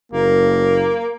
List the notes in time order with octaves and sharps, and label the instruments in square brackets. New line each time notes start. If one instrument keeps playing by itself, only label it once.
[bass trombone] F#1 [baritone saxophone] A#3